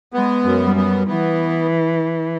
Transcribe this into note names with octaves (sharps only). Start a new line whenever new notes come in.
G#3 B3
F#2
G3
B3
E3 B3